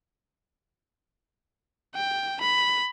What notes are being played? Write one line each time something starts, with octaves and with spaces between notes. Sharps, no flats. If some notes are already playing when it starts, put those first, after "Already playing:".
G5
B5